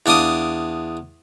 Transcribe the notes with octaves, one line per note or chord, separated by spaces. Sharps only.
E2 D4 F5 D6 D#6